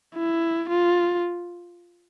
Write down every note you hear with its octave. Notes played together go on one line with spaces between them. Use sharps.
E4
F4